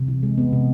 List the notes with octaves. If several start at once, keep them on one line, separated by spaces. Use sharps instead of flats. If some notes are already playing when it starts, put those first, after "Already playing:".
Already playing: C3
E3
G#3
B3
C3